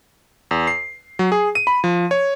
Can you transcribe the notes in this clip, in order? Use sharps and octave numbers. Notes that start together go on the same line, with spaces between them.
E2
C7
F#3
G#4
D#7
B5
F3
C#5